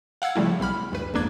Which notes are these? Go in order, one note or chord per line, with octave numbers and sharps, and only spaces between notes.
F5 F#5 E6 G#6 C#7
C#3 F3 G3 A3 E4
B1 G3 B5 F6
D2 G2 B4
G#1 F2 A#3 D4 G#6